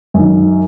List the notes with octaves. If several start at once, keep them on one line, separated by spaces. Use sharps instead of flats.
F#2 D#3